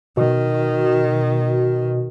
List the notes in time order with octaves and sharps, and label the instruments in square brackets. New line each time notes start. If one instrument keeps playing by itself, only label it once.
[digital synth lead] B2 [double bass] D#3